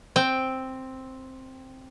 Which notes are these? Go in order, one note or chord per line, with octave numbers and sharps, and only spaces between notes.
C4 G5